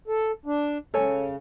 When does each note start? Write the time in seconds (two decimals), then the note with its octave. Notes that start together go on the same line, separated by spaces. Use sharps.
0.08 A4
0.46 D4
0.94 C#3 A4 C#5 G#5